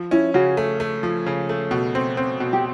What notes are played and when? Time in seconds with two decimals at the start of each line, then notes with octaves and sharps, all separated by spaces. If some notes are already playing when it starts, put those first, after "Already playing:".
Already playing: F3
0.11 C#4 E4
0.34 C#3 F#4
0.57 A3
0.80 A3
1.03 F3
1.26 C#3
1.49 A3
1.71 B2
1.95 C4
2.17 C4
2.40 B2
2.53 G4